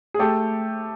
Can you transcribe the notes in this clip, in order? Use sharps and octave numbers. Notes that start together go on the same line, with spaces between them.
G#4
A3 G4 A4